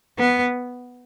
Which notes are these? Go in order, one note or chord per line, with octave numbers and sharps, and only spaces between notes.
B3